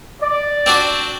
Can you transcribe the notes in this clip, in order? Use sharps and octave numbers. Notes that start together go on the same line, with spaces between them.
D5
C4 D4 F#4